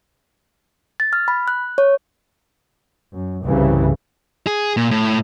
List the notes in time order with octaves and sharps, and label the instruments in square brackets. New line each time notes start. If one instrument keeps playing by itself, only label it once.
[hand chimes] A6
F6
B5
F#6
C#5
[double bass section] F#2
C2 G2 C#3 E3
[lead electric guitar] G#4
A#2
A2